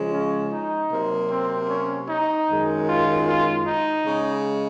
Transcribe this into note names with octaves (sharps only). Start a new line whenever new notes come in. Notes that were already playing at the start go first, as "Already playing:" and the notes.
Already playing: C#3 F3 G#3
C#4
D#4
C3 F#3 A#3
C4
C#4
D#4
F#2 D#3 G#3
F4
F4
D#4
C#3 G#3